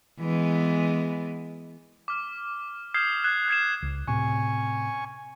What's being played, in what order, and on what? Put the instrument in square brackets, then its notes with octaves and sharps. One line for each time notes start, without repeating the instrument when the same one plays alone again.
[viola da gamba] E3 G#3 B3
[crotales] D6 F6
D#6 F6 G6 G#6 C7 E7
F6 F#6 G#6 E7
F#6 G#6 C7 E7
[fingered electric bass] C#2
[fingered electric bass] A2 C3 [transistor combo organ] G#5 C#6